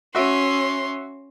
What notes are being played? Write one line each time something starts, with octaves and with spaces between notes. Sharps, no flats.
C#4 F#4 E5 C6